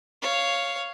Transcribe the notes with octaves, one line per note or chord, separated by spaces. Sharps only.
C#5 F5